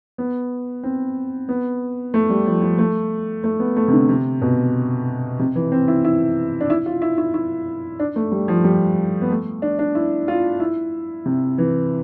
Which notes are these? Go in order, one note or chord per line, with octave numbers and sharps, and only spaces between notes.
B3
C4
B3
A3
G3
F3
F3
A3
A3
B3
A3
C3
D3
C3
B2
C3
E3
C4
E4
E4
D4
E4
F4
E4
E4
E4
D4
A3
G3
F3
G3
B3
A3
D4
D4
E4
F4
E4
C3
E3